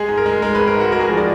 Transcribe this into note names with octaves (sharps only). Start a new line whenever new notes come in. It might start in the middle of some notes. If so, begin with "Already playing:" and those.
Already playing: G#3 G#4
G#2
A#4
G#3
G#3 A#4
B4
G#1
A#4
G#2 F#4
G#3 A#4
G#4
F3 A#4
D5